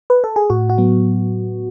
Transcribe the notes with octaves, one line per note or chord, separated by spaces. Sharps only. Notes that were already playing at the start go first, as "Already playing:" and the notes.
B4
A4
G#4
A2 F#4
F#4
F#3 B3